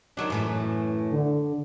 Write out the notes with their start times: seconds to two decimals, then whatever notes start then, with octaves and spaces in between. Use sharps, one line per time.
0.17 D#3 F#3 D4
0.30 F#2 A2 E3
1.12 D3